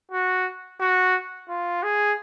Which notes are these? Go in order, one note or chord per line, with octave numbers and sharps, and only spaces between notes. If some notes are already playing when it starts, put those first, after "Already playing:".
F#4
F#4
F4
G#4